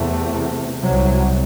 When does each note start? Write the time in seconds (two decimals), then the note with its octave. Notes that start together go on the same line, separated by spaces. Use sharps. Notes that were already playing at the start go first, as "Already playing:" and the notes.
Already playing: E2 C3 A3
0.82 C2 C3 F#3